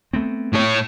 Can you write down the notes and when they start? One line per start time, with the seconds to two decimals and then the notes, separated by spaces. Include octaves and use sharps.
0.13 A3 B3 C4
0.53 A2 C#5